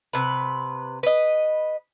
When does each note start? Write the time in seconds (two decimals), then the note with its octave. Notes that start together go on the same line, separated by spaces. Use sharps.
0.13 C3 B4
1.03 B4 D#5